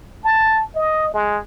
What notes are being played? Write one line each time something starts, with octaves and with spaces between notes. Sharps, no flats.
A5
D#5
G#3